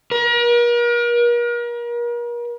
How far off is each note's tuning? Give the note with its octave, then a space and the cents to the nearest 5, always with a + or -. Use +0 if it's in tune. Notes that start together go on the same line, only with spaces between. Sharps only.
A#4 +40